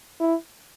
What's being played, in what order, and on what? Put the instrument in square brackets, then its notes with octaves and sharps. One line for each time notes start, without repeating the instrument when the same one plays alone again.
[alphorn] E4